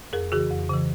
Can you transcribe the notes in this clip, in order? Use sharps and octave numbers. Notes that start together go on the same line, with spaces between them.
F2 G#4 A#4
C#3 E3 F#4 G#4
F2
C#3 E3